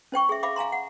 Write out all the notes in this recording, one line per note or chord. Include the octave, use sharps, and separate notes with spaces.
C#4 C5 G5 C#6
G#4 E5
E5 F5 B5 D6
F5 G#5 A#5 C6
F#5